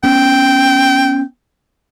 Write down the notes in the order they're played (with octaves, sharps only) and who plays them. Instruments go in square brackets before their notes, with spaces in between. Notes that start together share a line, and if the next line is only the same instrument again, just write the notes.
[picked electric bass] B3 C#4 [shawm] G5